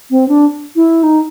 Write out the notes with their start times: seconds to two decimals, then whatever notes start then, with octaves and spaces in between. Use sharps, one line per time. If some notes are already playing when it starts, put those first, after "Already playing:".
0.10 C4
0.29 D4
0.76 E4
1.03 D#4